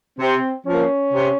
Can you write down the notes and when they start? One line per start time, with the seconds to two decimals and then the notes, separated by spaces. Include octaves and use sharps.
0.19 C3 C4
0.66 F3 A#3 C#4
1.13 C3